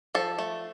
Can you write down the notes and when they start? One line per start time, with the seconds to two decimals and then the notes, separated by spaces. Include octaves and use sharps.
0.15 F3 A4
0.38 A3